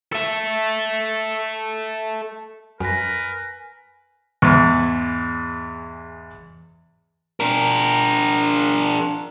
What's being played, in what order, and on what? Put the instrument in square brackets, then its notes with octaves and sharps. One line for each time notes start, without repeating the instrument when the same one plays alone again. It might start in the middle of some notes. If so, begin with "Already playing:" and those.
[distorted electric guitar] A4 E5
[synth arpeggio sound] F#2 [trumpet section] A#4 B4 [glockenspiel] G#5 A#6
[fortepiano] E2 G#2
[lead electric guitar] D4 A#4